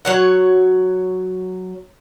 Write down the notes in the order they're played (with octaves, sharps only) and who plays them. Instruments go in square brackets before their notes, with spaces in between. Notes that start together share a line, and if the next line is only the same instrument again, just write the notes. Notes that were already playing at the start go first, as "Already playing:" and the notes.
[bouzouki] F#3 C#5 F#5